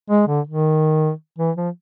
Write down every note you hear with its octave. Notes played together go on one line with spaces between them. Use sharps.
G#3
D3
D#3
E3
F3